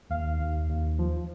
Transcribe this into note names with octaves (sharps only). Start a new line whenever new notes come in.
D#2 F5
D#2
D#2
F3